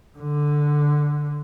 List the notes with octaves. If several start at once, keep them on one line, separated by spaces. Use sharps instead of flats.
D3